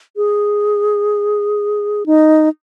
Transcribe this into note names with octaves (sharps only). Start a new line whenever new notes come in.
G#4
D#4